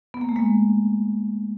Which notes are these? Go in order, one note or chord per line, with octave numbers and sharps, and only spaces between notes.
B3
A#3
A3
G#3 A#3